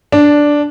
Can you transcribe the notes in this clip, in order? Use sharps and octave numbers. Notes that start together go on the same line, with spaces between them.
D4